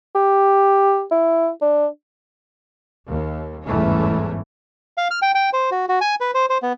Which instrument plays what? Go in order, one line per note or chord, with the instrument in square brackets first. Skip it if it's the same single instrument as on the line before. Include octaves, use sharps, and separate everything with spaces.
[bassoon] G4
E4
D4
[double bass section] D#2
G1 E2 G#2 E3 A3 C#4
[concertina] F5
F6
G5
G5
C5
F#4
F#4
G#5
B4
C5
C5
B3